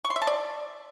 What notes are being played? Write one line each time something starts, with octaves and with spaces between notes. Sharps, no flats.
C#6
C6
E5
A5
D5